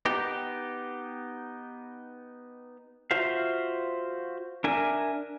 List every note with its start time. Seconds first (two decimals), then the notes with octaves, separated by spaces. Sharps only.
0.05 B3 D#4 G4
3.11 F4 F#4 C5 E5 F5
4.64 D4 A#4 E5 G#5